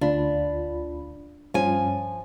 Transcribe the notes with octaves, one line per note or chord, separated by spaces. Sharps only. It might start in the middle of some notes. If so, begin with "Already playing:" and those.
D2 D4 F4 B5
G2 F3 C#4 F4 G#5